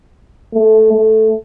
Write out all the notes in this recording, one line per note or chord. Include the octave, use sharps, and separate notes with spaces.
A3
A3